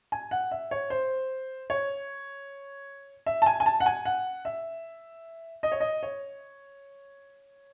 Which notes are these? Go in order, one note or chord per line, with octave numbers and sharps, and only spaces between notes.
G#5
F#5
E5
C#5
C5
C#5
E5
A5
G#5
G#5
A5
F#5
G#5
F#5
E5
D#5
C#5
D#5
C#5